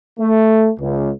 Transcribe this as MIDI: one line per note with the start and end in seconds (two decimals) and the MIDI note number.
0.20 0.70 57
0.79 1.10 37